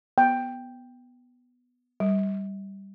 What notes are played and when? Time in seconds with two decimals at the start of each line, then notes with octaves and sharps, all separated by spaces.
0.18 B3 G5
2.00 G3